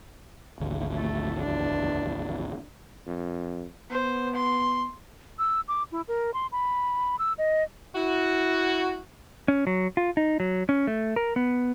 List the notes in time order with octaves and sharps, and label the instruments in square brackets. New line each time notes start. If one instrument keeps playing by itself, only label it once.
[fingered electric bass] G#1 D2
[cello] A3 A4
E2 D4
[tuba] F2
[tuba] B3 [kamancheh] C5
[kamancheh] C6
[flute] E6
D6
E4
A#4
C6
B5
E6
D#5
[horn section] E4 F#4
[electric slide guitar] C#4
F#3
F4
D#4
F#3
C#4
A3
A#4
B3